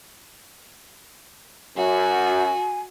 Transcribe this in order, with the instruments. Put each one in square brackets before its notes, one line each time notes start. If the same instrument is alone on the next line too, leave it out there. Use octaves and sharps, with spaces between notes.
[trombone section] F#2 [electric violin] F#4 [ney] G#5